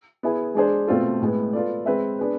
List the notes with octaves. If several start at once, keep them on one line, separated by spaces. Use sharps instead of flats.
B3 E4 G#4
G#3 D4 G#4 C5
B2 A3 C4 F4 A4
A2 G#3 B3
B3 F4 A4 D5
G#3 C4 G#4 B4 E5
B3 D4 G#4 B4